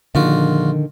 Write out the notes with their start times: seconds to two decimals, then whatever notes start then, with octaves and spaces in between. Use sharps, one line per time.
0.15 A#1 D3 D#3 F4 F#4